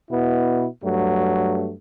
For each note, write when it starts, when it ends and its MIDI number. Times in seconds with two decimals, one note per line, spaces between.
0.10 0.66 47
0.10 0.66 59
0.10 0.66 64
0.83 1.74 43
0.83 1.74 54
0.83 1.74 57